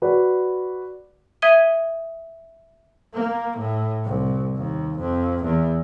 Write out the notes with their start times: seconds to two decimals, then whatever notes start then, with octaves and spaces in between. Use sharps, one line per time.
0.02 F#4 B4 D5
1.42 E5 D#6 G#6 D#7 G7
3.14 A#3
3.59 A2
4.05 C2
4.55 D#2
4.99 F2
5.45 E2